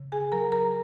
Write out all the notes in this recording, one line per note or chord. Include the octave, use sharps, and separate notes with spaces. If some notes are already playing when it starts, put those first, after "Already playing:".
Already playing: C#3
G#4 G#5
F#3 A#4 A#5
A#4 A#5